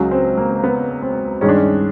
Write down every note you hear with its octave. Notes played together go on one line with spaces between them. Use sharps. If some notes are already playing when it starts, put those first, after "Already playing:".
Already playing: C#2 C#3 F#3
C4
A#3
B3
C4
G2 D#3 G#3 C#4
D4
C#4